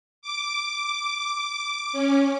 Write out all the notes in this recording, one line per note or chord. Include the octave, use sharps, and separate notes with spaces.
D6
C#4